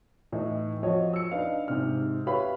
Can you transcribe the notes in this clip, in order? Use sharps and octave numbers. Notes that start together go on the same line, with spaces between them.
A2 E3 D#4
F2 F#4 C#5 D#5
E6 C#7
D4 D#4 B4 F5
G#2 C3 F6
G4 B4 C#5 E5 F5 B5